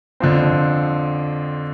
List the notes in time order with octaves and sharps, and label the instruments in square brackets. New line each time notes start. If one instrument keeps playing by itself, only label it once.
[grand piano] F2 D3 F3 C4